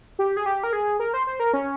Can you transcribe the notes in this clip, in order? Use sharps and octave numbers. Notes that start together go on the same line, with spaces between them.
G4
G#4
G4
A#4
G#4
A#4
C5
C5
A#4
C#4